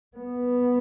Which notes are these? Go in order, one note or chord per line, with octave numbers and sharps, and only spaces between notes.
B3